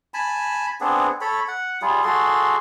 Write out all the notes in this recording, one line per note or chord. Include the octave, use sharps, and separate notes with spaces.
G#5 A5 B5
B3 C4 D4 G#4
A4 C#5 B5
F#5
G3 F4 G#4
F#4 G#4 A4 C6